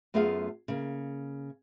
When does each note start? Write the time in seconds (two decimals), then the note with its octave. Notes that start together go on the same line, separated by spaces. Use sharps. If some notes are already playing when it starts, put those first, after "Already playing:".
0.14 F#2 A3 B3 F4 G#4 F5
0.68 C#3 A#3